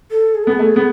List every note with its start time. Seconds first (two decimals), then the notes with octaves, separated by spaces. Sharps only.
0.11 A4
0.35 G#4
0.43 A4
0.47 B3 G#4
0.59 A3
0.76 B3